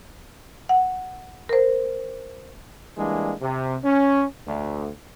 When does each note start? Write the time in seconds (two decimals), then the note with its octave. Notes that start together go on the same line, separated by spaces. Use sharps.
0.69 F#5
1.49 A#4 C5
2.97 E3 G3 G#3 A#3 D4
3.41 C3
3.84 C#4
4.47 D2